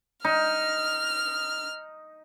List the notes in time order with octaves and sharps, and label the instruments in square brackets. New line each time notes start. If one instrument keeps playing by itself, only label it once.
[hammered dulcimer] D#4 [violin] F6